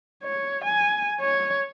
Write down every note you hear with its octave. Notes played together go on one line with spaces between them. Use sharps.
C#5
G#5
C#5